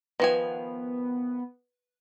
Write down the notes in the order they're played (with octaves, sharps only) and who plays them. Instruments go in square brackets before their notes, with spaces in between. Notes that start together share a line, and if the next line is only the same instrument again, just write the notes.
[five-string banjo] D#3 F3 G#5 [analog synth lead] B3 [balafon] B4